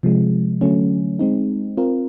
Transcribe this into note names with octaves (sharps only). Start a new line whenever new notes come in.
C3 F3 G#3
D3 F#3 A3 C#4
G#3 C4 D#4
C4 F4 A#4